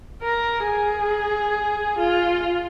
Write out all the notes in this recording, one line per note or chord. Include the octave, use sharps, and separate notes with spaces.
A#4
G#4
F4